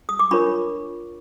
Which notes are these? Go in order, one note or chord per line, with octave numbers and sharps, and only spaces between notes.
D#6
D6
D4 F4 A#4 C#5 B5 C#6